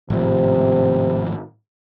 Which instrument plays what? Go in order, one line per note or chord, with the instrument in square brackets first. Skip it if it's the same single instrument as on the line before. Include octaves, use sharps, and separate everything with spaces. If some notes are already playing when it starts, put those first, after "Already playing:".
[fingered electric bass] G#1 A2 F3 [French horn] C3